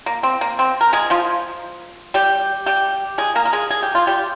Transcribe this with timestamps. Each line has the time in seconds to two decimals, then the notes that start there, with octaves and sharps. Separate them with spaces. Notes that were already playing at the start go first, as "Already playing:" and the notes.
0.06 A#3
0.23 C4
0.41 A#3
0.59 C4
0.81 A#4
0.93 G#3 G#4
1.10 F3 F4
2.14 G3 G4
2.66 G3 G4
3.18 G#3 G#4
3.35 A#3 A#4
3.45 A#4
3.53 G#3 G#4
3.71 G#4
3.83 G4
3.95 F4
4.07 G3 G4